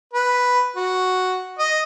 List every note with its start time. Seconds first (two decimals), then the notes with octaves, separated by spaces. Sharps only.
0.13 B4
0.76 F#4
1.59 D#5